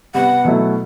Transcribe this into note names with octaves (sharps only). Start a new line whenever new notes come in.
C3 G3 B3 F#5
B2 F#3 A3 E4